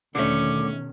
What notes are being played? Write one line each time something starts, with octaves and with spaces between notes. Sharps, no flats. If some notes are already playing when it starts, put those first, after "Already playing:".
E2 B2 D3 D#3 A3 C#4 D6